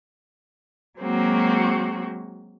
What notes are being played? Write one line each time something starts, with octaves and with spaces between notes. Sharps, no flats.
F#3 G#3 A#3 C4 F#4